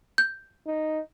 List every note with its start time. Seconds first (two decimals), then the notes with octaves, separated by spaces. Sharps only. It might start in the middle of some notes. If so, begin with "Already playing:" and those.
0.18 G6
0.67 D#4